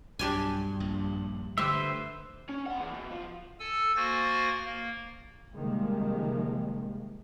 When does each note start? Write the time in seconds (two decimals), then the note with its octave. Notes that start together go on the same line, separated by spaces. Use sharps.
0.19 B1 G2 D4 G4 G#5
0.80 A#1
1.58 D3 A3 G4 B4 C5 E5
2.49 C#4
2.66 C4 F#5
2.80 E2
2.93 B2
3.11 F3
3.60 A4 G#5 E6
3.96 A#3 F#4 C5 G#5 A6 A#6
4.65 A#3
5.56 C3 D#3 F3 G3 G#3 A#3